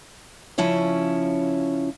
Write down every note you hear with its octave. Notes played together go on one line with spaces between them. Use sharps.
C#3 F3 C#4 E4 C#5